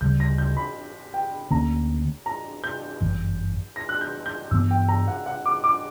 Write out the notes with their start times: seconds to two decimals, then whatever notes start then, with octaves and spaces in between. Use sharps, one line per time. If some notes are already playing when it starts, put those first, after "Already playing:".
0.01 D2 C#3 G3 G6
0.20 A#6
0.38 G6
0.57 B5
1.14 G5
1.51 D2 D3 A#3 C#4 A#5
2.26 A#5
2.64 G6
3.01 G1 F#2 E3
3.76 A#6
3.89 F#6
4.01 G6
4.26 G6
4.51 G2 E3 B3 E6
4.71 G5
4.88 A#5
5.08 F#5
5.26 F#5
5.46 D6
5.64 D6